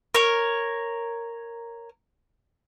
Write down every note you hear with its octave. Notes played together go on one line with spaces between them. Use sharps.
A#4 C#5